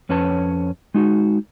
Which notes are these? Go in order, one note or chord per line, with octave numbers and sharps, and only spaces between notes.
F2 C#4 B4 C#5 A5
G#3 D#4 F#4